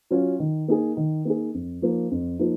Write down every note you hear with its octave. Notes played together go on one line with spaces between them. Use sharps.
F#3 C#4 F4
D#3
A#3 D#4 G#4
D#3
A#3 D#4 G#4
F2
F3 A#3 D#4
F2
F3 A#3 D#4